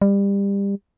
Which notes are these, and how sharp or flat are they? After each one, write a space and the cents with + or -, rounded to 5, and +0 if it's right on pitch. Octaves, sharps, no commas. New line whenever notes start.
G3 +25